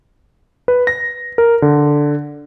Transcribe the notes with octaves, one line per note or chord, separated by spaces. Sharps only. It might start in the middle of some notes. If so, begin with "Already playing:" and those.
B4
A#6
A#4
D3